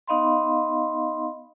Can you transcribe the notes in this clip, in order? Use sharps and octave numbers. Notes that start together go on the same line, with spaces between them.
B3 D#4 D#5 F5 B5 C6